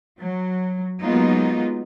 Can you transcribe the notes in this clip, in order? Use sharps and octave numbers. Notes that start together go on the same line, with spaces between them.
F#3
F#3 G#3 A#3 B3 D#4 F4